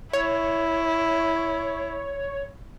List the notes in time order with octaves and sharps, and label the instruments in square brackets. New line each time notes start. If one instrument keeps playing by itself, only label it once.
[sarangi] E4 [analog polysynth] C#5